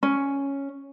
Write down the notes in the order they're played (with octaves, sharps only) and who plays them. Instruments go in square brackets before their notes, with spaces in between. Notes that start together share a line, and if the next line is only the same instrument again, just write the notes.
[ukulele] C#4